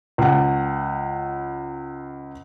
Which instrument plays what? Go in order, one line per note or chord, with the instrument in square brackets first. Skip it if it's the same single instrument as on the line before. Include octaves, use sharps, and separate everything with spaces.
[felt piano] C#2 F#5